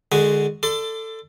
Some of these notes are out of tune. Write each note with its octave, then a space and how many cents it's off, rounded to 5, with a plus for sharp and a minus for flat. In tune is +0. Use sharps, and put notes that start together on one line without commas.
D3 +20 G#3 -5 F#4 +0
A4 +15 D5 +10 C6 -35